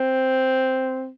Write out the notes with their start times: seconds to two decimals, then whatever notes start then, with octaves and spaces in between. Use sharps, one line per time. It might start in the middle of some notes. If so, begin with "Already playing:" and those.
Already playing: C4